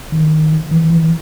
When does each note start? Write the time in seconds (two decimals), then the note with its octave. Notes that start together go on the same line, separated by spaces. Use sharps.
0.12 D#3
0.71 E3
0.90 E3